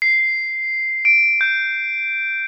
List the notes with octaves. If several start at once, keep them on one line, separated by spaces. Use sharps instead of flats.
C7
D7
G6